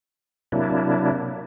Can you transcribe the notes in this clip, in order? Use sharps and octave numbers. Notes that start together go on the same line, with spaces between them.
C3 F#3 A#3 D4 E4